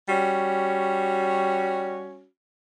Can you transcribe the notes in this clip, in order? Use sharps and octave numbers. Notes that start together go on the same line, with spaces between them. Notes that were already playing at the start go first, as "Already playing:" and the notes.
G3 C#4 F#4